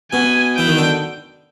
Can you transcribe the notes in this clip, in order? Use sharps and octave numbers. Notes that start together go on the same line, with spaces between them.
B2 G#5
E3 G5
D#3
D3